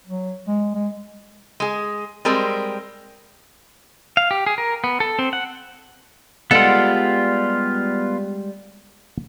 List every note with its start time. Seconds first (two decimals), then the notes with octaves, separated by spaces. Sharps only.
0.07 F#3
0.48 G#3
0.74 G#3
1.60 G#3 G#4
2.25 G3 G#3 C4 A#4
4.17 F5
4.31 G4
4.46 G#4
4.58 A#4
4.84 B3
5.00 A4
5.19 C4
5.33 F#5
6.51 G3 G#3 B3 F4 A4 D5 F#5